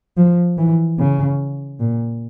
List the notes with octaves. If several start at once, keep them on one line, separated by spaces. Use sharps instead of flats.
F3
E3
C#3
A#2